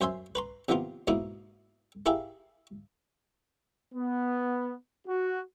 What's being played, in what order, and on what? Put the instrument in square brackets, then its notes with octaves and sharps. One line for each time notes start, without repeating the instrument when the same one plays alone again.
[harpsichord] F#2 C5 E5 G#5 C6
B4 A#5 C6
C3 D#3 F3 A#3 B3 F4
G#2 B2 A#3 D#4 E4
E4 G4 G#4 A#4 E5 F5
[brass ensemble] B3
F#4